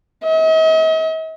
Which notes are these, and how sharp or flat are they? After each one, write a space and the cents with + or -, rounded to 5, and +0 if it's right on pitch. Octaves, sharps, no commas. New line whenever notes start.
D#5 +45